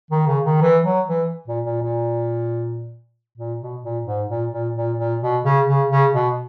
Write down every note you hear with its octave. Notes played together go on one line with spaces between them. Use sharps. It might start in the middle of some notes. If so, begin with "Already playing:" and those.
D#3
C#3
D#3
E3
F#3
E3
A#2
A#2
A#2
A#2
B2
A#2
G#2
A#2
A#2
A#2
A#2
B2
C#3
C#3
C#3
B2